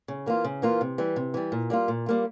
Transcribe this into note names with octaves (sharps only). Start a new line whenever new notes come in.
C#3
E3 A#3 F4
C#3
E3 A#3 F4
C3
E3 G3
C3
E3 G3
A#2
G3 A#3 F4
A#2
G3 A#3 F4